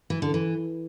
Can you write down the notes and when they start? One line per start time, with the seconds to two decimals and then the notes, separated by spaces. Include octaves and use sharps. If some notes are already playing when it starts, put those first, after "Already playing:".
0.10 E3
0.22 D3
0.34 E3